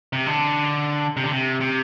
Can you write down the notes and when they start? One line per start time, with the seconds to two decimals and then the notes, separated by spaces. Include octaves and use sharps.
0.13 C3
0.26 D3
1.17 C3
1.23 D3
1.31 C3
1.61 C3